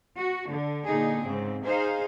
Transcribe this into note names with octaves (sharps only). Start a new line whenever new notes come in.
F#4
D3
A#2 D3 D#4 G#4
G#2 C#3 C4
D#4 G#4 C5 F5